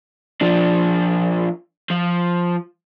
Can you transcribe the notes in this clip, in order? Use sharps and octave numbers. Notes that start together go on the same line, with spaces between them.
F3 D4
F3